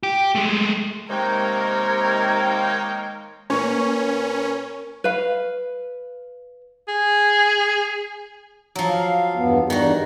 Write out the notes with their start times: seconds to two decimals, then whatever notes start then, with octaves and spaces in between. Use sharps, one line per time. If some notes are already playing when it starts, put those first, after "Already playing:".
0.03 G4
0.35 G#3 A3
1.10 C3 D#3 G#3 A#3 D#4 A#4 C#5 G5
3.50 A#2 A#3 C#4 B4 C#5
5.04 B4 F5
6.88 G#4
8.75 F3 F#3
8.89 F5
9.36 E2 G2 B3
9.70 E2 G2 D#3 G3 F#4